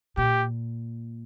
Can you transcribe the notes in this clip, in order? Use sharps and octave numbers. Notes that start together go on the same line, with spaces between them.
A#2 G4